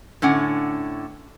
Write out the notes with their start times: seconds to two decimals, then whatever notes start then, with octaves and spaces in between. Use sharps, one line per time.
0.22 A2 D3 C#4 F#5